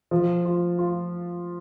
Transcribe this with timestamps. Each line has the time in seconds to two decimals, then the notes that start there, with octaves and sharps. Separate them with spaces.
0.11 F3
0.45 F4
0.79 F4